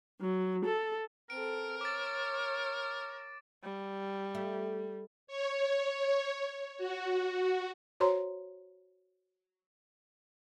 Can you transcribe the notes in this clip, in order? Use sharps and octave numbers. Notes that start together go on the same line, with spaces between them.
F#3
A4
C4 A4 A#4 D7
C#5 D6 A6
G3
A3
C#5
F#4
F#4 C5 C#5 A#5 C6